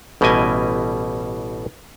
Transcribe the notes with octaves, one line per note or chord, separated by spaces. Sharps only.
A1 B2 G3 E4 D#5 G#5